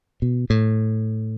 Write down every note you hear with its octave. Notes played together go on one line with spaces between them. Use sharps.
B2
A2